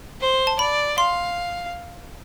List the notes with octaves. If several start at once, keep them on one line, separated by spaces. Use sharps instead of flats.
C5
A5
D5 B5
F5 C6